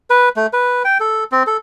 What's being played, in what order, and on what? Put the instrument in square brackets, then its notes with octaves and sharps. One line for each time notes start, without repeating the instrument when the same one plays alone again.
[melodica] B4
A3
B4
G5
A4
C4
A4